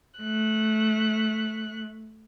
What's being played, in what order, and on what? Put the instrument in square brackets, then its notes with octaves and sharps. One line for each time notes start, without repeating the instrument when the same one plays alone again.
[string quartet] A3 F#6